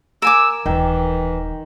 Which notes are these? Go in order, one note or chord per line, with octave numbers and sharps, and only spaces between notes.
A#4 G#5 D6 E6
D#1 D#3 E3